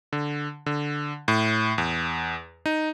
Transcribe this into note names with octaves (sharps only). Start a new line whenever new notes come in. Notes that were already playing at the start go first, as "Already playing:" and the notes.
D3
D3
A2
E2
D#4